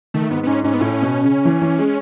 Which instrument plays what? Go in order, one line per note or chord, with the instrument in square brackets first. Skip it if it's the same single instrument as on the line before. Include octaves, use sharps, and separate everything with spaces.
[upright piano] D#3 [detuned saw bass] A3
[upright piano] G#2 [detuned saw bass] B3
[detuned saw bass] B3
[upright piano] G#2 [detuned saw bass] C#4
[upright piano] G#2 [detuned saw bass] C#4
[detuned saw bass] B3
[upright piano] A2 [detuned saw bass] C#4
[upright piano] B2
C#3
E3
E3
G#3